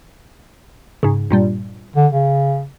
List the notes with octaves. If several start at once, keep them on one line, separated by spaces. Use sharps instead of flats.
G#2 C#3
G2 A#2 G3
D3
C#3